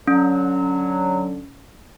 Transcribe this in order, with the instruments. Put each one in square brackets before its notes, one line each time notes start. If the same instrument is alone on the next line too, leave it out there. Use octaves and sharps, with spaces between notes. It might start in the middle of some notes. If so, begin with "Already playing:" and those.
[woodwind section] D3 F#3 [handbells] C#4